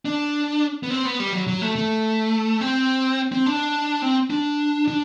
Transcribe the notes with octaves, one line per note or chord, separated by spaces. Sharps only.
D4
B3
C4
B3
G3
F#3
F#3
A3
A3
C4
C4
D4
C4
D4
D4